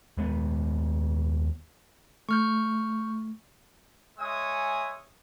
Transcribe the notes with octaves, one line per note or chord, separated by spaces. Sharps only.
D#2 G#3 B3
A3 C#6 F6 G6
G#3 C#5 E5 G#5 D#6